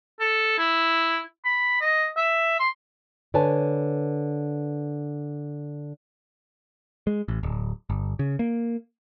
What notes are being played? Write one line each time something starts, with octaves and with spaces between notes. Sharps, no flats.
A4
E4
B5
D#5
E5
C6
D3 B4 C#5 G#5 A5
G#3
A1
D1
G1
C#3
A#3